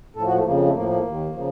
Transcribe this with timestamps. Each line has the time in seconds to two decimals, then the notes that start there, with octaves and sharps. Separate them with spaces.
0.16 A2 A4
0.20 F3
0.27 F#4
0.36 A3
0.45 F2 C#3 F3 A#3
0.65 A3
0.75 A2 F3 A#3
0.90 A#3
1.05 D#2
1.10 D#3
1.34 C#3 F3